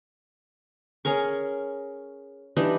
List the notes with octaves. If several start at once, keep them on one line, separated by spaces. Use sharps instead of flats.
C#4 G#4 A#4 C#6
E3 G3 D4 D#4